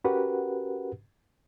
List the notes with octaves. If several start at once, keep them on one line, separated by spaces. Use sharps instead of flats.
C#4 F#4 G4 A#4 B4 F#5